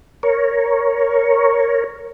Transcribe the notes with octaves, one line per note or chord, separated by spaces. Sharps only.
A#4 C#5